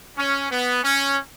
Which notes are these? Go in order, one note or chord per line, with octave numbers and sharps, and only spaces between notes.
C#4
B3
C#4